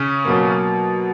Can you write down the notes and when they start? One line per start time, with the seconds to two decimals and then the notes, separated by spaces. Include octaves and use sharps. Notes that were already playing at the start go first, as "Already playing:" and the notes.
Already playing: C#3 C#4
0.25 B2 F#3 A#3